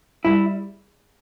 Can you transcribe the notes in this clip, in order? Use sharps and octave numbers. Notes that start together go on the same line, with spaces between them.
G3 E4